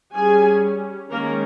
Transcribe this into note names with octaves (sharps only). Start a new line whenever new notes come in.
G3 C#4 G#4 G#5
D#3 G#3 A#3 C#4 A#4